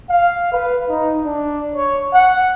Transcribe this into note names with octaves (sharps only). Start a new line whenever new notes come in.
F5
B4
D#4
D4
C#5
F#5